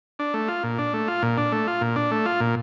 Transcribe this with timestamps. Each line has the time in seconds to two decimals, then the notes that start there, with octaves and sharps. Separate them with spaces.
0.19 D4
0.34 A3
0.48 F4
0.63 A#2
0.78 D4
0.93 A3
1.08 F4
1.23 A#2
1.38 D4
1.52 A3
1.67 F4
1.81 A#2
1.96 D4
2.11 A3
2.26 F4
2.40 A#2